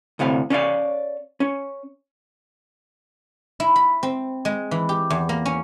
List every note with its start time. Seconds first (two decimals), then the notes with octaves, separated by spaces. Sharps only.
0.19 D2 A2 C3 F5
0.50 C#4 C#5 D5 F5
1.40 C#4
3.60 E4
3.76 B5
4.03 C4
4.45 G#3
4.71 E3
4.89 G4
5.10 E2
5.29 A#3
5.45 C#4